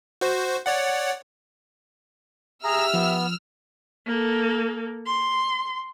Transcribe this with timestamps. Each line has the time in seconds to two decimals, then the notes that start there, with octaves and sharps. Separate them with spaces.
0.21 F#4 C5
0.66 C#5 D5 F#5
2.64 G4 G#4 E5 A#5 E6 F6
2.94 F3 B3
4.06 A#3 A4
5.06 C6